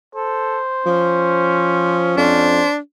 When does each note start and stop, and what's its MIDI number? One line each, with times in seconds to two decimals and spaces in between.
0.15 0.59 69
0.15 2.00 72
0.86 2.13 53
0.86 2.68 61
2.17 2.62 41
2.17 2.77 62
2.17 2.70 72